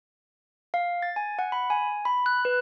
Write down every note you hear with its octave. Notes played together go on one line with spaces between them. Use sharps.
F5
A6
G#5
F#5
B5
G#5
B5
F#6
B4